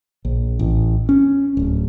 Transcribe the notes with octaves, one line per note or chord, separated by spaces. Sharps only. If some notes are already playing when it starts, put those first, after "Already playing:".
A#1
A1
C#4
D1